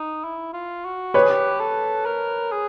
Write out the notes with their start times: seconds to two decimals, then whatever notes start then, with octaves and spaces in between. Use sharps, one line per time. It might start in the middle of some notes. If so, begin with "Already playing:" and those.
Already playing: D#4
0.24 E4
0.53 F4
0.85 F#4
1.14 G4 B4 C#5
1.23 G#4
1.30 G4
1.60 A4
2.06 A#4
2.52 G#4